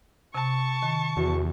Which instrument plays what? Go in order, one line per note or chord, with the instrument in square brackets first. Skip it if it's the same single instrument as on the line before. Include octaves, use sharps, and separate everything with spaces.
[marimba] C3 [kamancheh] A5 C#6
[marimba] D#3
[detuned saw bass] E2 [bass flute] F#4